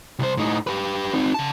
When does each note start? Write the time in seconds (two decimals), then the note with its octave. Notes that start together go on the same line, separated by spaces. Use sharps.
0.19 C2 C5
0.37 A2 D#4
0.67 G4 B4
1.13 C4 D#4
1.34 C#3 A5